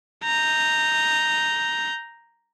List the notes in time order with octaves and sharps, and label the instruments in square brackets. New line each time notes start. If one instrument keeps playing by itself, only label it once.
[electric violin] A#5 G6